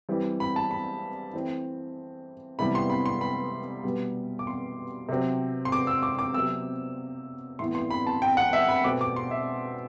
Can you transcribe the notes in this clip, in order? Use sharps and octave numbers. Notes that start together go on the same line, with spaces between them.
E3 G3 C4
B5
A5
B5
E3 A3 C4
C3 E3 G3 B3 B5
C6
B5
C6
B5
B2 G3 B3
D6
C6
C3 F#3 C4
C6
D6
E6
D6
D6
C3 F#3 B3 E6
A2 E3 B3 C6
C6
B5
A5
G5
F#5
E5
B5
B2 A3 C4 D6
D6
C6
E5